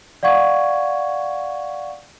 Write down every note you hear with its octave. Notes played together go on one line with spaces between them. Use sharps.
D5 F5 F#5 C#6 G#6